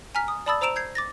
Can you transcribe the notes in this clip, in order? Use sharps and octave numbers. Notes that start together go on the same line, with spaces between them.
G#5 A#5 F6 B6
D#6
D5 A5 B5 D#6 E6 A6
C5 A#5 E6 D7 E7 F7
G6 G#6 C7
D6 A6 A#6